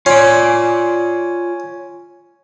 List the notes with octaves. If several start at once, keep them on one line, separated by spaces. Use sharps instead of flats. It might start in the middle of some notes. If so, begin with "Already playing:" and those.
C#4 F4 D5